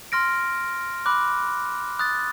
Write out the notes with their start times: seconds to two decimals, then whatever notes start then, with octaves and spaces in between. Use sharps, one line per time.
0.12 C6 F6 A#6 D7
1.06 B5 D6 F#6
1.99 D#6 F#6 A6